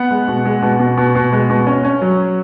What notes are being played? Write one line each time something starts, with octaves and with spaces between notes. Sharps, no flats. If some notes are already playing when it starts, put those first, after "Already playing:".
Already playing: B3 F#5
G#3
B2
G#3
B2
B2
B2
B2
G#3
B2
C#4
C#4
F#3